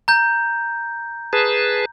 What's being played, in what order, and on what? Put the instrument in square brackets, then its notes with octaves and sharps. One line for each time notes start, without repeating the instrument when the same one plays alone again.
[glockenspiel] A#5 G6
[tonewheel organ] G#4 B4 A5